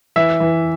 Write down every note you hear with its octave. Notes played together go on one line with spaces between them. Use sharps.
E3 E5
E3